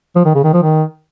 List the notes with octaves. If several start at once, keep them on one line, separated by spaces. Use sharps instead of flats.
F3
D#3
C#3
D#3
F3
D#3